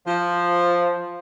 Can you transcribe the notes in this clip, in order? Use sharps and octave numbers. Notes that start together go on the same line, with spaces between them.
F3